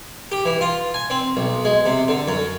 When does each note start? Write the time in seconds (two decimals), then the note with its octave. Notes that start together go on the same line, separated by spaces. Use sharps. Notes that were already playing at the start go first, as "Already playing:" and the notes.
0.32 G4
0.45 E3
0.61 F4
0.94 G#5
1.10 C4
1.37 B1
1.65 G#3
1.86 C3
2.08 D3
2.28 F#2